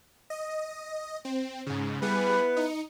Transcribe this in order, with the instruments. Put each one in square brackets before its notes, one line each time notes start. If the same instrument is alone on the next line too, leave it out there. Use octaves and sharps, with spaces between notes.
[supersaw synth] D#5
C4
G#2 C#3
[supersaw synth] G3 G#4 [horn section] B3 E4 B4
[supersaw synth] D#4 C#7